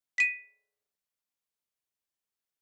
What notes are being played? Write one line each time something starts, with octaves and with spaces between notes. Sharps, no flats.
B6 D#7